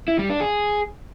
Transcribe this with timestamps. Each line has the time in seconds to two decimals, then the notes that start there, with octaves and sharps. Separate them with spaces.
0.08 E4
0.19 G3
0.30 D4
0.40 G#4